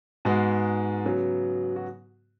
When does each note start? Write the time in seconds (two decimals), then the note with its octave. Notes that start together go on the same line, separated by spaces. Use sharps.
0.25 G#2 G#3 B3 F#4
1.05 C#3 F#3 B3
1.76 F#4